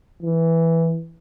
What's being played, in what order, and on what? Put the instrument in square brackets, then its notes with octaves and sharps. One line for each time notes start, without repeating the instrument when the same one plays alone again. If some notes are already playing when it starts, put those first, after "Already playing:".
[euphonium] E3